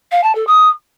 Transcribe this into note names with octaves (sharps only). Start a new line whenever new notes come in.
F5
A5
A4
D#6